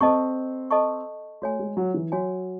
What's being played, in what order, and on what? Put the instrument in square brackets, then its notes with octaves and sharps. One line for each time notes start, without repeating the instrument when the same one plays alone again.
[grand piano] C4 [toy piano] A4 D#5 A5 C#6
[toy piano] A4 D#5 A5 C#6
[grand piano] A3 [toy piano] F#4 C#5 G#5
[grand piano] G#3
F#3
E3
[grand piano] F#3 [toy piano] F#4 C#5 G#5